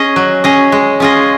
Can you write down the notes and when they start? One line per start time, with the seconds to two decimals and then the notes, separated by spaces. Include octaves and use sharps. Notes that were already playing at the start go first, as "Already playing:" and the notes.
Already playing: C#4 G#4 D#5
0.16 F#3
0.44 C#4 G#4 D#5
0.72 G#3
1.00 C#4 F4 G#4 D#5